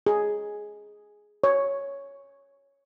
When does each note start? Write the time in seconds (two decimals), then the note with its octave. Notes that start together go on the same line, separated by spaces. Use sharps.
0.07 G#4
1.44 C#5